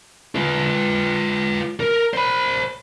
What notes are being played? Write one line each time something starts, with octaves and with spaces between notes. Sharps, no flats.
F4 B4
A#4
C5 B5